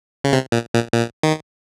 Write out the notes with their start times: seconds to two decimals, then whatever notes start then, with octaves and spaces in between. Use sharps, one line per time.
0.24 C#3
0.33 C3
0.52 A#2
0.74 A#2
0.94 A#2
1.23 D#3